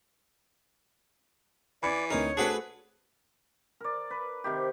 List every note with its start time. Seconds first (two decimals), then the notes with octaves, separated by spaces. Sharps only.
1.83 E3 D5 B5 G#6 C#7
2.10 D2 C4 D#4 A#4 C#5
2.37 A3 D4 F#4 G#4 B4 C5
3.80 A#4 D5
4.10 B4
4.44 C3 D#3 G4